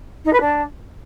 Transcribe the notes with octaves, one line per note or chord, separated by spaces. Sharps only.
D#4
B4
D4